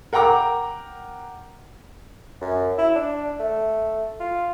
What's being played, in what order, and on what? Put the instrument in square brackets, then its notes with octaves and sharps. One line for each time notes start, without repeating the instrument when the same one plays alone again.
[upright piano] A#4 F#5 G5 A#5 D6
[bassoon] F#2
E4
D4
A3
F4